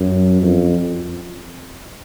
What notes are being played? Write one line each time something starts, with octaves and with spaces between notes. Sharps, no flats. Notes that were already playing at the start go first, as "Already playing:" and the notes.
Already playing: F#2
F2